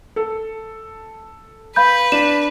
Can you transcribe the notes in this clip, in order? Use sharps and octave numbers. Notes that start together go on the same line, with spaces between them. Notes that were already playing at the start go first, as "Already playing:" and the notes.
A4
B4 F5 B5 G6
D4 E7